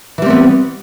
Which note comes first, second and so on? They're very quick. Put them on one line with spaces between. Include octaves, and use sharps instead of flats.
E3 G3 C4 B3